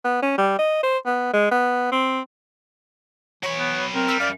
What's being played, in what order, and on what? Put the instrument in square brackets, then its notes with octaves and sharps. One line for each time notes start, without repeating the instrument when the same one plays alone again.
[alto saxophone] B3
C#4
G3
D#5
C5
B3
G#3
B3
C4
[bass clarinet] E3 [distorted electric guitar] F#3 B5 [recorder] C#5
[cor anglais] B3
[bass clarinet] C4 [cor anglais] A#4
[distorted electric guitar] G3 [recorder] E6
[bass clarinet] F#2 [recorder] D5 [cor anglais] F5